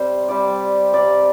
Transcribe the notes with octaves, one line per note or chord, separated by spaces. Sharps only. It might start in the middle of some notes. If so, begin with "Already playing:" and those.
Already playing: C3 G3 C5
C3 G3 D5
C3 G3 D5